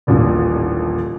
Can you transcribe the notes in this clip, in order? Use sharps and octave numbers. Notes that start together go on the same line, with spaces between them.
D#1 A1 A#2 D3